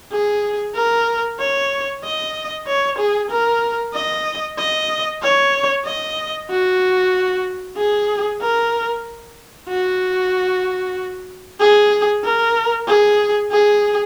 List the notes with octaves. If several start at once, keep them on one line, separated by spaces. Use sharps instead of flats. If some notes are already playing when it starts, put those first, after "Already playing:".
G#4
A#4
C#5
D#5
C#5
G#4
A#4
D#5
D#5
C#5
D#5
F#4
G#4
A#4
F#4
G#4
A#4
G#4
G#4